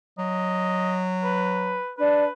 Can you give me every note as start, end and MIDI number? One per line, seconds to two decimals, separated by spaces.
0.18 1.79 54
0.18 1.03 75
1.23 1.93 71
1.98 2.23 62
1.98 2.32 71